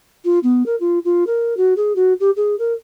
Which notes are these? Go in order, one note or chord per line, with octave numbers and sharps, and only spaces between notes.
F4
B3
A#4
F4
F4
A#4
F#4
G#4
F#4
G4
G#4
A#4